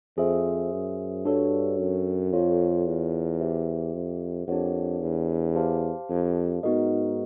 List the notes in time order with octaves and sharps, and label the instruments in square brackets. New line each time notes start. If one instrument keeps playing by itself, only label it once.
[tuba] F2 [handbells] G#4 C5 E5
[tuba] F#2
[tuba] G2 [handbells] D4 F#4 A4 C#5
[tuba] F#2
[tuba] F2 [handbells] F4 A4 C#5 F5
[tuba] E2
[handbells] G4 C5 E5
[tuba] F2
[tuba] F2 [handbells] D4 G4 A#4 C#5 F#5
[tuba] E2
[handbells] G4 C5 F5 A5
[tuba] F2
[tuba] G#2 [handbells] B3 D#4 F#4 A#4 D#5